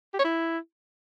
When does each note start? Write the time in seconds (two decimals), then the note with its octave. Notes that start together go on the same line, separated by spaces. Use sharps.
0.14 G4
0.19 C#5
0.24 E4